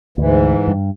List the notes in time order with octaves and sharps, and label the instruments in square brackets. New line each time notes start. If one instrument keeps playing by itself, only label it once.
[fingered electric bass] D2 [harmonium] G#2 E3
[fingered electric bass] G2